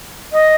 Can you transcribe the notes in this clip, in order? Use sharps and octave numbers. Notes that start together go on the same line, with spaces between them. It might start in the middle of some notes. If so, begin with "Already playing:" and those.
D#5